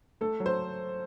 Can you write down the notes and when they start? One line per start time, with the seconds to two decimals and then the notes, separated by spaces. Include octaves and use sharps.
0.21 A3 A4
0.40 F#3
0.46 C5